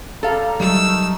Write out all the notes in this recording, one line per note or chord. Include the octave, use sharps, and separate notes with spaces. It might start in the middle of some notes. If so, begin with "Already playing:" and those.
G3 A4 F5 A#5
F#3 G3 A3 D#4 A#4 E6